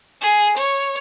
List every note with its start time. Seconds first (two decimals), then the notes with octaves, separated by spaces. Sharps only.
0.21 G#4
0.58 C#5